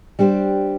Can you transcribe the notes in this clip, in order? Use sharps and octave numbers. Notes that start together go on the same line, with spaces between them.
G3 D4 G4 C5